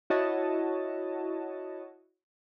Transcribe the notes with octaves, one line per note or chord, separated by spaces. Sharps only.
E4 F#4 C#5 D#5 A5